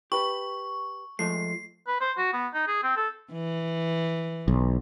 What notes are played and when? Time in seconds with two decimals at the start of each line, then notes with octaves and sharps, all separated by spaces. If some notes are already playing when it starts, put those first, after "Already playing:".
0.12 G4 B4 C#6
1.19 F3 G#3 A3 C7
1.87 B4
2.00 C5
2.18 F#4
2.33 B3
2.54 D#4
2.67 G#4
2.83 C4
2.96 A4
3.32 E3
4.48 B1